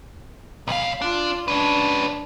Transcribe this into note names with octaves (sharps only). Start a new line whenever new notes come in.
B1 F5 B5
D4 F4
C#4 D4 B4